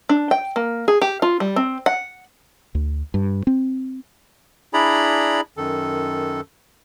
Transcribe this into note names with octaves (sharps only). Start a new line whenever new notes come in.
D4
G5
A#3
G#4
G4
F4
G3
C4
F#5
D2
G2
C4
D4 E4 G#4 D5 A#5 B5
F#2 D#3 A4